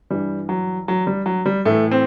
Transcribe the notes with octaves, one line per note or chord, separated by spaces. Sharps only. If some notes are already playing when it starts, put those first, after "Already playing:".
G2 E3 G3
F#3
F#3
G3
F#3
G3
A2 E3 A3
C4